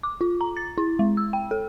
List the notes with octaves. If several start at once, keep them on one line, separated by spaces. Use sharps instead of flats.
D6
F4
A#5
A6
E4
G#3
E6
G5
A4